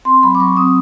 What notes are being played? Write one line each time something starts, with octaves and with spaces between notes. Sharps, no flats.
C4 C6
F#3 B5
D6
F#3 C#6
C4 D#6